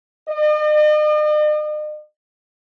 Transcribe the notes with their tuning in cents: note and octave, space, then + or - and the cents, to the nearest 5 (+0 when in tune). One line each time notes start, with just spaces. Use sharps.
D#5 -45